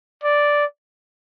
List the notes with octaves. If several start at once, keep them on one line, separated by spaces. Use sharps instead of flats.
D5